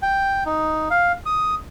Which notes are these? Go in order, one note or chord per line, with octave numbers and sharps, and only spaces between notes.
G5
D#4
F5
D#6